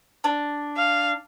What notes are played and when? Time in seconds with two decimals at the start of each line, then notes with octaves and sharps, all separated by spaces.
0.24 D4
0.77 F5